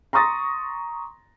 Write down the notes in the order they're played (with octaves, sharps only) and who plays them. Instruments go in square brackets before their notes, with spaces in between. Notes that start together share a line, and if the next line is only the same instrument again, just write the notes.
[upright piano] A#5 C6 C#6 D#6 A6 A#6